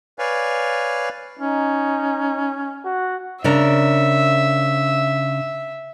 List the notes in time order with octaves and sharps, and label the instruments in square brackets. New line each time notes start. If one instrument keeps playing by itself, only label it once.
[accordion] B4 C#5 D5 F5 G#5
[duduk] C#4 [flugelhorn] D#4
[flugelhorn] F#4
[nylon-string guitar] C#3 D4 A#4 [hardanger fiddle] E5